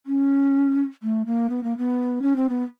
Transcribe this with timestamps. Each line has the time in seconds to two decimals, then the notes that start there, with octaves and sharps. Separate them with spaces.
0.06 C#4
1.03 A3
1.26 A#3
1.50 B3
1.63 A#3
1.78 B3
2.22 C#4
2.36 C4
2.49 B3